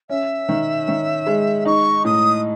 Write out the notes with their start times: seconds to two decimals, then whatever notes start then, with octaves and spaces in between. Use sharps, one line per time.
0.09 C#4 E5
0.49 D#3
0.88 D#3
1.27 G#3
1.65 D#4 C#6
2.05 A2 D#6